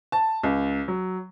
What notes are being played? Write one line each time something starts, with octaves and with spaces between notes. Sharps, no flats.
A5
C#2
F#3